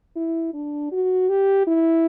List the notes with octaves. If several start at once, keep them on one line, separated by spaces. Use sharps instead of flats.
E4
D4
F#4
G4
E4